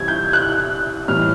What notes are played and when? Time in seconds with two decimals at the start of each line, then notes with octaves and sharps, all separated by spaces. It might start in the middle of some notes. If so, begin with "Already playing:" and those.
Already playing: C3 E3 G3 G#6
0.08 G6
0.33 F#6
1.08 A2 E3 G3 F6